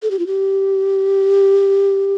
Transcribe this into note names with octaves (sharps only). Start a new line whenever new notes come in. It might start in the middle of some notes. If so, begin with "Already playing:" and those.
A4
G4
F4
G4